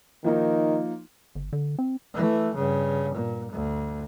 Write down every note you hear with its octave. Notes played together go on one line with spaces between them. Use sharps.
D#3 F3 A#3 D#4
G1
D3
C4
E3 A3
G2 C#3
A#2
D2